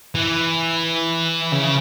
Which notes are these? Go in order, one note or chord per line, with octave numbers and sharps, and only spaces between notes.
E3
C#3